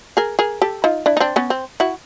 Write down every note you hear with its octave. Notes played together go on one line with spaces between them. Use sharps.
G#4 A#4
G#4 A#4
G4 A4
D#4 F4
D4 E4
D#4
C4 D4
B3 C#4
C4
E4 F#4